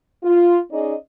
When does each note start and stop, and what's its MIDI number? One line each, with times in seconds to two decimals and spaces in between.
0.23 0.58 65
0.71 0.94 61
0.71 0.94 63
0.71 0.94 68
0.71 0.94 74
0.71 0.94 75